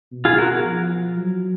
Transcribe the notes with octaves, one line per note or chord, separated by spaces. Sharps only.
B2
F4 G#4
F#4 A#4
F3
F#3